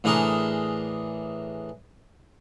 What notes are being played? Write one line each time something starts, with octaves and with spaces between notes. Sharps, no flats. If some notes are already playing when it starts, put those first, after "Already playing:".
A2 E3 D4 G#4 A#4 C6